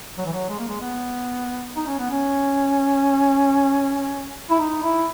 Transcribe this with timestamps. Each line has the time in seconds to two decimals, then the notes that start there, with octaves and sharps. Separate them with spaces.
0.18 F#3
0.26 E3
0.33 F#3
0.49 G#3
0.59 A#3
0.68 G#3
0.81 B3
1.76 D#4
1.87 C#4
1.98 B3
2.10 C#4
4.50 E4
4.59 D#4
4.83 E4